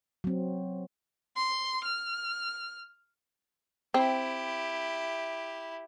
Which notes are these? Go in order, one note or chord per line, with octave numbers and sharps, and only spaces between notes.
F#3 C4
C6
F6
C4 E4 G4